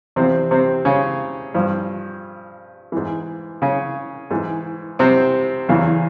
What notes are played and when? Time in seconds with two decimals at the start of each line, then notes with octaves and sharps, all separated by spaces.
0.16 E2 C3 F3 C4
0.51 C3 C4
0.85 C#3 C#4
1.54 G2 F3
2.92 G#2 E3
3.62 C#3 C#4
4.31 G#2 E3
4.99 C3 C4
5.69 E2 C#3 E3